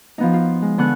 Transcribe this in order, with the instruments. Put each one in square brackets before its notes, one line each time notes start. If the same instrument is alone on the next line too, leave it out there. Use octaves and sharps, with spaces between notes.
[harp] F3 B3 D#4
F4
G#3
D3 B3 C#6 F#6